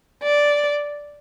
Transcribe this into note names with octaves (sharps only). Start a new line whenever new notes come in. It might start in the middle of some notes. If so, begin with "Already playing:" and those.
D5